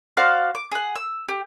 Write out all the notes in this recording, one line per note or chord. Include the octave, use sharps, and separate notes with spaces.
F#4 C5 D5 F5
D6
G#4 F#5
E6
G4